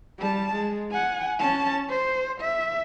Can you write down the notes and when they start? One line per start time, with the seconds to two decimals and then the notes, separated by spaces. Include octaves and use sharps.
0.19 G3 A5
0.55 G#3
0.91 F#5 G#5
1.39 C#4 A5
1.89 C5
2.41 E5